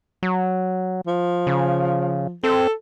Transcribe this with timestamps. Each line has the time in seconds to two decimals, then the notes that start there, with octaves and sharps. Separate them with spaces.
0.23 F#3
1.07 F3
1.47 C#3
2.43 C4 A4